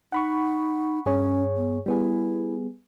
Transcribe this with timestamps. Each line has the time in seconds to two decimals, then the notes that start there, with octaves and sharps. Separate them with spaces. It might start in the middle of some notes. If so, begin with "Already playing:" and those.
0.12 D#4 F#5 B5 C#6
1.06 G2 C#4 G#4 C#5
1.56 B3
1.86 G3 B3 E4 G#4